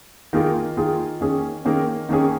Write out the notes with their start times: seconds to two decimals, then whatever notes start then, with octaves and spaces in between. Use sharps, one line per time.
0.33 D#3 A#3 F4 G#4
0.77 D#3 A#3 F4 G#4
1.21 D#3 A#3 C#4 G#4
1.65 D#3 A#3 C#4 G#4
2.09 D#3 A#3 C#4 G#4